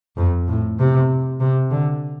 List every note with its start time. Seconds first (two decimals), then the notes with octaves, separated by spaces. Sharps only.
0.17 F2
0.47 A2
0.79 C3
1.40 C3
1.71 D3